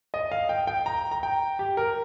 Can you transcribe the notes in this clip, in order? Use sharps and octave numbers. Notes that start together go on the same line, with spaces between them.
D#5
F5
G5
G5
A#5
A#5
G5
G4
A#4